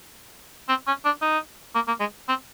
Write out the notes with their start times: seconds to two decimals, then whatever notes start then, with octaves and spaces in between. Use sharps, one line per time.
0.68 C4
0.87 C#4
1.05 D4
1.22 D#4
1.75 A#3
1.87 A#3
2.00 G#3
2.28 C4